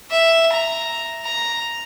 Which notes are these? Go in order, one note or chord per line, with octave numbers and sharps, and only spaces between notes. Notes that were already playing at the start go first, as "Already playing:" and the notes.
E5
A#5
A#5